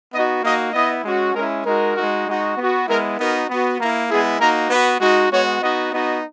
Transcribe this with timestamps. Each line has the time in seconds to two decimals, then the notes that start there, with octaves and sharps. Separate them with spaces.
0.13 B3 D#4 F#4 D#5
0.43 A#3 D#4 F#4 D#5
0.73 B3 E4 D#5
1.04 G#3 C#4 F#4
1.34 G#3 C#4 E4 A#4
1.65 G#3 D#4 F#4 A#4
1.95 G#3 D#4 F#4
2.26 G#3 D#4 F#4
2.56 B3 F#4
2.87 G#3 B3 E4 A#4
3.18 B3 D#4 F#4 A#4
3.48 B3 F#4
3.79 A#3 E4 A#4
4.08 G#3 B3 E4 G#4
4.39 A#3 D#4 F#4 A#4
4.69 B3 F#4 B4
5.00 G#3 D#4 F#4
5.30 G#3 B3 F#4 C#5
5.61 B3 D#4 F#4 D#5
5.92 B3 D#4 F#4 D#5